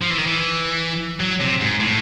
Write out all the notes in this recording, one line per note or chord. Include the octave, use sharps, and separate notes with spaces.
F3
E3
D#3
E3
F#3
C3
G#2
A2